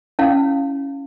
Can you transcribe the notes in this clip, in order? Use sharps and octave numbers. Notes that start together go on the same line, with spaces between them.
C#4 E4 F5